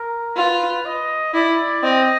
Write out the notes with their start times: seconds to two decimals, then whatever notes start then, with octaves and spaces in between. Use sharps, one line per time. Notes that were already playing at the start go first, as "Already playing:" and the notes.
Already playing: A#4
0.36 F4 B4
0.85 D#5
1.34 E4 D5
1.83 C4 D#5